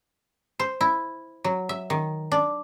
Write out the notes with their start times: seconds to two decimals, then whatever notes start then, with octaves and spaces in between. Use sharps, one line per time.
0.59 C5
0.81 E4
1.44 F#3
1.69 E5
1.90 D#3
2.32 D4